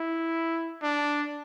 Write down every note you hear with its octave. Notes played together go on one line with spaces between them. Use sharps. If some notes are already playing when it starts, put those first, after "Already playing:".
Already playing: E4
D4